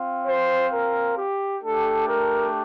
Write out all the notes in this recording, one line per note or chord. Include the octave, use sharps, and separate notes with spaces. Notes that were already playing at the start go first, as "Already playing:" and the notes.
Already playing: C4 F4
C5
A#4
G4
A3 D4 G4 A4
A#4